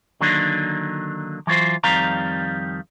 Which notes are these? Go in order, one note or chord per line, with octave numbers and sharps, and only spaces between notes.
D3 D#3 F#3 A#3 D4 D#4
E3 F#3 F4 C5
F2 D#3 G3 C4 F5 A#5